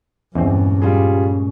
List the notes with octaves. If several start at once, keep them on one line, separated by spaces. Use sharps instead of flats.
E2 G2 A#2 G#3 C4 C#4
G3 F4 G#4